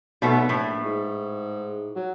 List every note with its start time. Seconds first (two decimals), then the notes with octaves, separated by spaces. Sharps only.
0.22 B1 B2 A3 B3
0.49 A#1 A2 B4
0.85 G#2
1.96 F#3